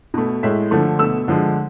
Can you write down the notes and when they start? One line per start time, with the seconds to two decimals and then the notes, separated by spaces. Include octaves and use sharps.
0.14 B2 A3
0.43 A2 G#3 E5
0.71 D3 F3 A3
0.99 B2 A3 E6
1.28 D3 F3 G#3